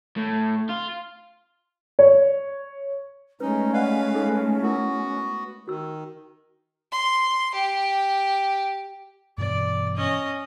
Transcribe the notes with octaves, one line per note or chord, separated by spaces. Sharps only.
A2
F4
C#5
G#3 A3 C#4 D#4 B4
B4 D5 D#5 F5 F#5
D#4 G#4 A4
B3 E4 F#4 A#4
D#3 F#4 E6
C6
G4
G2 B2 E3 D5
C#4 D#5